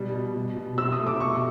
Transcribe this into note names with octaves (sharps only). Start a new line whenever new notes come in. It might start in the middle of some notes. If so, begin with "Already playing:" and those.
Already playing: B2 G3
B2
B2
B2
C3 E6
D#6
A3
D6
B2 C#6